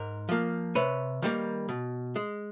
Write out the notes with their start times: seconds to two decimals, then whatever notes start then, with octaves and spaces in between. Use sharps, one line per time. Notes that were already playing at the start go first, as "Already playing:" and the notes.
Already playing: G#2 A#4
0.29 F3 A#3
0.75 C3 B4 C#5
1.22 D#3 G3 A#3
1.69 B2
2.16 G#3